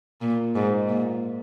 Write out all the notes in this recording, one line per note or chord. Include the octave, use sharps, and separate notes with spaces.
A#2
G#2
A#2